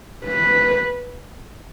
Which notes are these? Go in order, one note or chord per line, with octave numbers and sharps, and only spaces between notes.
B4